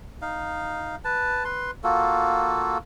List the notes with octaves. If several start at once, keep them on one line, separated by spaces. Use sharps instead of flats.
D#4 F5
B4 A5
B4 C6
A#3 F4 F#4 A4